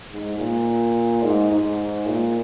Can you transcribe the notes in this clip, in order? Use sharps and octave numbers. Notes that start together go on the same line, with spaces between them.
G#2
A#2
G#2
G#2
A#2